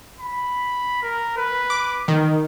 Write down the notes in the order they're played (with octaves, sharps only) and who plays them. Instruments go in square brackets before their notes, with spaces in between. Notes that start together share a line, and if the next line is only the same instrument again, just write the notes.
[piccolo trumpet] B5
A#4
B4
[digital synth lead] D6
D#3